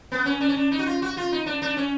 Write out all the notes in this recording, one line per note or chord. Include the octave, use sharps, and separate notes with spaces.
B3
C#4
D4
C#4
D4
D#4
F#4
F4
F#4
F4
D#4
D4
D4
C#4